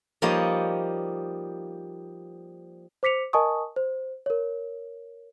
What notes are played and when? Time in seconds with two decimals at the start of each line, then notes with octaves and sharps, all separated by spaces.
0.22 F3 G3 A#3 D#4 C#5 D#5
3.03 C5 D6 B6 C#7 F7
3.33 A#4 D#5 G#5 A5 C#6 D#6
3.76 C5
4.26 A#4 C#5